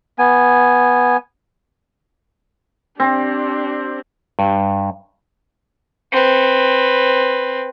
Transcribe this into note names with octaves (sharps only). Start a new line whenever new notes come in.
B3 G#5
C4 D4 G4
G2
C4 B4